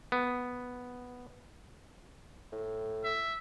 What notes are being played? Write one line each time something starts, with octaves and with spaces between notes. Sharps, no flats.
B3
A2
E5